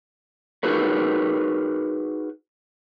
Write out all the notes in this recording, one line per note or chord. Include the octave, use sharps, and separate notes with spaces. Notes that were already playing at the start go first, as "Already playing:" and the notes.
D#4 F#4 G#4 A#4 B4 C#5